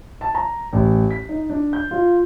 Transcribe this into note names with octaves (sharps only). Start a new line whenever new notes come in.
A5
A#5
A1
B6
D#4
D4
G6
F4